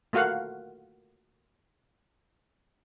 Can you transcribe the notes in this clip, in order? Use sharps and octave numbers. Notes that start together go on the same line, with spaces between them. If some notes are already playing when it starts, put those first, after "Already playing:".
A3 A#3 F#4 F5 F#5